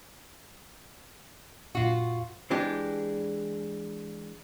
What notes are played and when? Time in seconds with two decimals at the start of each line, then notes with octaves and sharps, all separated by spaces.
1.75 F#2 A#2 F4 F#4
2.50 E3 G#3 D4 G4